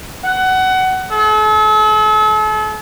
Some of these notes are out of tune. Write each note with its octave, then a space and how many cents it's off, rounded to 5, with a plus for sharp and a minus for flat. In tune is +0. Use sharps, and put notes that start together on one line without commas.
F#5 +20
A4 -40